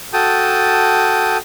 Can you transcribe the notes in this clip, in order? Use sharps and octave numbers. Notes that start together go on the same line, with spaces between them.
F#4 A4 G5 A5 D#6